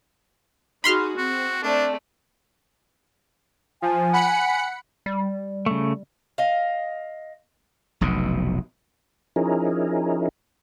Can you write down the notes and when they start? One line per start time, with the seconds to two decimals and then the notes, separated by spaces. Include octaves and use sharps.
0.84 D#4 F#4 G#4 B5 C6 F6
1.17 C4 F#4
1.63 A3 D4 D5
3.82 F3 G#5
4.13 F#5 B5 C#7
5.06 G3
5.66 C#3 A3
6.38 D#5 F5
8.01 F1 B1 B2
9.36 F3 C#4 D#4 E4 G#4 A#4